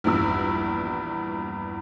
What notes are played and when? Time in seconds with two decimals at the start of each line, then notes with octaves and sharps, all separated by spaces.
0.04 A#1 E2 G2 E6